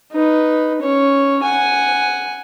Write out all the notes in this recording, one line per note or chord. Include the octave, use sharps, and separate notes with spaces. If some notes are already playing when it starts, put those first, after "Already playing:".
D#4 B4
C#4 C#5
F#5 G#5